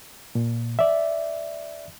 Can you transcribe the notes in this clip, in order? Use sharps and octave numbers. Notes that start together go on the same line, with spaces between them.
A#2
D5 E5